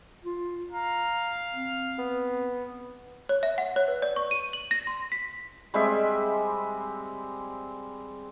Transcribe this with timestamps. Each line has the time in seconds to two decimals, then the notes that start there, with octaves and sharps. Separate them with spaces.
0.24 F4
0.72 F5 A#5
1.53 C4
1.99 B3
3.29 C#5
3.43 E5
3.58 F#5
3.76 C#5
3.88 B4
4.02 D5
4.16 C#6
4.31 D#7
4.53 F#7
4.71 A#6
4.87 C6
5.12 B6
5.74 G3 G#3 C4 E5